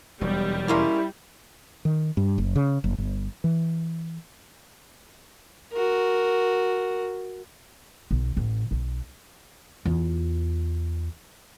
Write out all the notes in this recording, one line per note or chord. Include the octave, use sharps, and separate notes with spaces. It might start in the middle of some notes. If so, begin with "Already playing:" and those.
E1 D#2 F#3 G3
G#3 A#3 C#4 E4
D#3
G2
F#1
C#3
F#1
G1
E3
F#4 A#4
B1
A1
B1
E2 F4